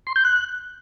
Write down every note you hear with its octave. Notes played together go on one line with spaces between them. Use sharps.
C6
G6
F#6